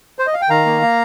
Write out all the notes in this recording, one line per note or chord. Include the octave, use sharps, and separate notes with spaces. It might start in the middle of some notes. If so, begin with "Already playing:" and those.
C5
D#5
F5
G5
D#3 F5 A#5
A#3
A#3